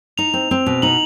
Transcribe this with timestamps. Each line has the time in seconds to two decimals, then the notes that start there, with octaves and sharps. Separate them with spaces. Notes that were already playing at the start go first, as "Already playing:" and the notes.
0.18 D#4 F7
0.34 C4
0.51 C4
0.66 B2
0.82 D#4 F#7